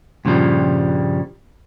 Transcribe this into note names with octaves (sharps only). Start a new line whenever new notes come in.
G2 A#2 C#3 F3 G3